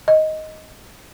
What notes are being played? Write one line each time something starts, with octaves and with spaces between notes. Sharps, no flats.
D#5